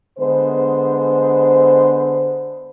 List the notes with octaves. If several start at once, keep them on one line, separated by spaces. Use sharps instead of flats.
D3 G#3 B3 C5